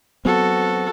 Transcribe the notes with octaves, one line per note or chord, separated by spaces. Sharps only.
F#3 B3 C4 F#4 A4